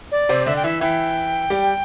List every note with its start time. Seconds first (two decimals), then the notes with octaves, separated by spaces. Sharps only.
0.12 D5
0.29 C3 C4
0.46 D3 D4 E5
0.56 G5
0.64 E3 E4 E5
0.81 E3 E4 G5
1.50 G3 G4